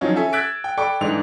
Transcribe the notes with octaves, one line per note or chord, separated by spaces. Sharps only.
D#3 F3 F#3 C#4 D#4 F4
C#4 A4 E5 G#5
E6 F#6 G#6 A6 B6 D7
G5
A4 D5 G5 B5 C#6 D6
G#2 E3 D4 D#4 A4 F7